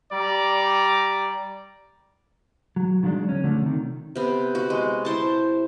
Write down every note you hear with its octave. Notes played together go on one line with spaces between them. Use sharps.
G3 D5 A#5
F#3
D#3 F3 F#3 G#3 D4
D2 C#4
D3 F3 A3 D4
C3 D#3
C3 B3
F#4
G#3
E4 C5 A5